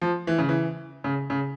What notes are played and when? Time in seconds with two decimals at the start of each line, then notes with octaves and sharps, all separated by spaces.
0.02 F3
0.27 E3
0.38 C#3
0.49 E3
1.04 C#3
1.30 C#3